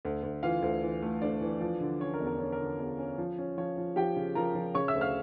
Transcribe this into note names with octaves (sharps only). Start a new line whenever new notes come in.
D2
D2
E3 F4 F5
D2
E3
A3
D2 D4 D5
E3
F3
D3
C#4 C#5
A#4
E2
A#4
C#4 C#5
A#4
D3
E2
C#4
F3
C#4
F3 C#5
F3
F3 G4 G5
C#3
F3 A#4 A#5
F3
C#3 C#5 C#6
E5 E6
D2
F5 F6